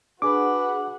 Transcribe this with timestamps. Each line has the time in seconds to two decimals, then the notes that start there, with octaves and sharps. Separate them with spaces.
0.22 D4 F#4 G#4 B4 F#5 D6